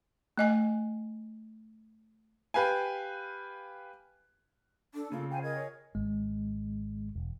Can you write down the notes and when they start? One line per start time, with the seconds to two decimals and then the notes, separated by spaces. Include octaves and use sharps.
0.38 A3 D#5 G#5
2.54 G4 B4 F5 G#5
4.94 D4 A4
5.12 C#3 A#3 F4
5.31 C5 F5 G5 G#5
5.42 G#4 A#4 D#5 G#6
5.56 C#5
5.95 G#1 G#3
7.16 E1